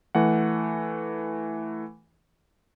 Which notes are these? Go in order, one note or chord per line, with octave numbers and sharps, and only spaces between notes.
E3 A3 F#5